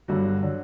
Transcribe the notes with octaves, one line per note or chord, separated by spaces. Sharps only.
G1 G2 D3 F#3 F#4
D3 F#3